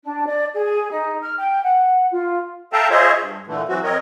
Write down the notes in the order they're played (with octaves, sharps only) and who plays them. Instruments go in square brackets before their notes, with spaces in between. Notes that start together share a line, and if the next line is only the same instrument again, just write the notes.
[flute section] D4
D5
G#4
D#4
F6
G5
F#5
F4
[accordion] A4 E5 F5 G5 A5 A#5
F4 G#4 C5 C#5 D#5 E5
G2
A#2 D3 E3 A3
E3 F#3 C4 F#4
F2 C4 A#4 C#5 D#5